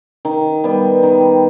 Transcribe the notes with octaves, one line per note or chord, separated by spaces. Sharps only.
D#3
G3 B3
D#3